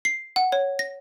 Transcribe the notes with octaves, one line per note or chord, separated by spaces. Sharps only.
C7
F#5
C#5
A#6